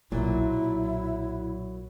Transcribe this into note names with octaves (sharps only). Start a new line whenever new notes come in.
B1 A#2 F#3 E4